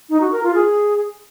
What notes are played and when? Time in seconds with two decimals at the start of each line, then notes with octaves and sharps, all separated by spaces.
0.10 D#4
0.21 F#4
0.32 A#4
0.43 F4
0.55 G#4